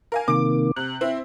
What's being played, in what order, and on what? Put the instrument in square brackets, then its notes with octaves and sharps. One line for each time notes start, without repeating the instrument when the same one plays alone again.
[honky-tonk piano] A#4 F5 G#5
[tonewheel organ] C3 D#3 A#3 [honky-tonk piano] D6 D7
[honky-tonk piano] C3 [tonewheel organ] F#6
[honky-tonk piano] C4 E4